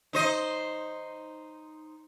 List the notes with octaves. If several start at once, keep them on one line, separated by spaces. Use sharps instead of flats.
D#4 C5 D#5